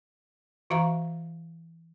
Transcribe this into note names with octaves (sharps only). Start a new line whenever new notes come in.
E3 F#4 E5 F5 A#5 C#6